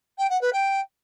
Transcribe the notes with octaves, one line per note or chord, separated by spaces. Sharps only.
G5
F#5
B4
G5